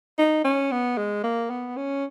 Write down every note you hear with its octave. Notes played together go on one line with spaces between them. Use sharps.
D#4
C#4
B3
G#3
A#3
B3
C#4